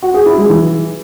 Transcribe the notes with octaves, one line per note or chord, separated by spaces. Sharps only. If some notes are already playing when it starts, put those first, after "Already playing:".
F#4
G#4
E4
G#3
E3